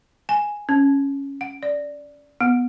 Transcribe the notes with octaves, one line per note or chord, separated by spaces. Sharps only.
G#5
C#4
F#5
D5
B3